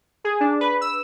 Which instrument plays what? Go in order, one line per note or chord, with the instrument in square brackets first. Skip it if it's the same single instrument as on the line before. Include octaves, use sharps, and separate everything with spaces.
[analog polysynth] G#4
D4
B4
E6